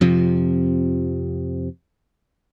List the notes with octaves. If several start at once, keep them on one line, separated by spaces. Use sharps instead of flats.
F2 C3 F3